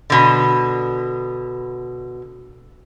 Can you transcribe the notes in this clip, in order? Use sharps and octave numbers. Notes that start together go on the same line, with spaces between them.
B2 D3